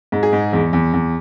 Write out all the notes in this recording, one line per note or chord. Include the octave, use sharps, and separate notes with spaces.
G#2
G#4
G#2
E2
E2
E2